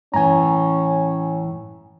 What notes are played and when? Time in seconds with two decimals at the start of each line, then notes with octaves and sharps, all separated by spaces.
0.14 A2 E3 C#4 G#5 A#5